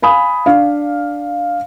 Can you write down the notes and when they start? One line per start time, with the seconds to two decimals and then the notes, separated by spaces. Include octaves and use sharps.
0.02 F5 G#5 B5 D#6
0.46 D4 F5